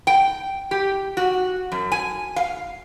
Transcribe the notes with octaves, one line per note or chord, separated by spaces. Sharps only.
G5
G4
F#4
F#2
G#5
F5